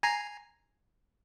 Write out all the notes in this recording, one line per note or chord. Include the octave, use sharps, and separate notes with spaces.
G#5 A#5 C7